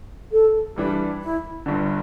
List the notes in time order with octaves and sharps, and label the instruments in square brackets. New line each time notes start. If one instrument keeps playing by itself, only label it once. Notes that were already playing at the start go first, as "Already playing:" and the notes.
[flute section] A4
[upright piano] G2 E3 G3 D4 [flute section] G4
[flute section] E4
[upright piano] G1 G2 D3